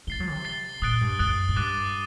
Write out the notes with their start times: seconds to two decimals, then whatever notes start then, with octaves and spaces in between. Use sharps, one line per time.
0.07 A3 A6 C7 G7
0.20 F#3
0.32 C3
0.45 A6 C7 G7
0.82 A#2 D#6 F#6 A6 D7 G7
1.01 G2
1.19 F#2 D#6 F#6 A6 D7 G7
1.49 A2
1.56 G2 D6 F#6 A6 D#7